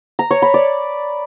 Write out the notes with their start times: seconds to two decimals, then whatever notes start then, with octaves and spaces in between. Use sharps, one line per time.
0.19 A#5
0.31 C#5
0.42 B5
0.54 D5